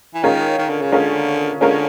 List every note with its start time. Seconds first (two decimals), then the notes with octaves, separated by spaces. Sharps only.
0.14 E3
0.23 D#3 G#3 C#4 F4 A#4 C#5
0.58 D#3
0.69 D3
0.82 C#3
0.92 D3 G#3 C#4 F4 A#4 C#5
1.61 D3 G#3 C#4 F4 A#4 C#5